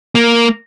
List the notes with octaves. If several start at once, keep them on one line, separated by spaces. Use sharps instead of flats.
A#3